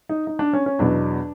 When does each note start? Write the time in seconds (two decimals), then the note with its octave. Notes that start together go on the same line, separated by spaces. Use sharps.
0.09 D#4
0.27 D#4
0.39 D4
0.53 C#4
0.66 C#4
0.79 E2 B2 F#3 D4